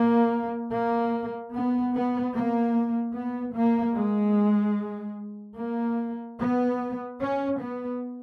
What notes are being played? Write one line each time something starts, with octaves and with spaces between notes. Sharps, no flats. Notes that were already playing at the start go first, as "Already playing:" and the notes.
Already playing: A#3
A#3
B3
B3
A#3
B3
A#3
G#3
A#3
B3
C#4
B3